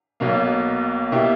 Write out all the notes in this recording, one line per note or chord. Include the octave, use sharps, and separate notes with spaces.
B1 B2 A#3
B2 A#3 E4 G4